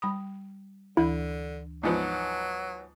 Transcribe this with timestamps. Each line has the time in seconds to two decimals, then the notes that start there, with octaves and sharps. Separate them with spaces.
0.02 G3 B5 D#6
0.97 D2 D3 E3 E4 B5
1.83 G#2 F3 F#3 B3